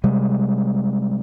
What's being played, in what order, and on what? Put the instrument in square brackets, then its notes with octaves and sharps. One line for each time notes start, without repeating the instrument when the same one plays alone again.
[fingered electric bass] C3 G3 G#3